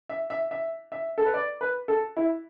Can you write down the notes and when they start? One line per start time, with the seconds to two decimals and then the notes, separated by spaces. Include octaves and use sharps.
0.09 E5
0.30 E5
0.51 E5
0.92 E5
1.18 A4
1.25 B4
1.34 D5
1.61 B4
1.88 A4
2.17 E4